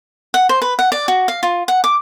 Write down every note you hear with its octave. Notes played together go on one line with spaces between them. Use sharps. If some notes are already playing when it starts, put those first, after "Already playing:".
F#5
C5
B4
F#5
D5
F#4
F5
F4
F#5
D6